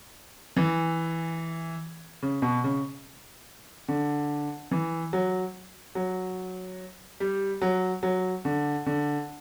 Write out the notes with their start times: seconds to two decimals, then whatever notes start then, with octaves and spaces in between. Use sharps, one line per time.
0.57 E3
2.22 C#3
2.42 B2
2.64 C#3
3.88 D3
4.71 E3
5.13 F#3
5.95 F#3
7.20 G3
7.61 F#3
8.03 F#3
8.45 D3
8.86 D3